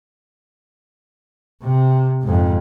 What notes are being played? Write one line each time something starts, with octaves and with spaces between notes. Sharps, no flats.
C3
F2 G#2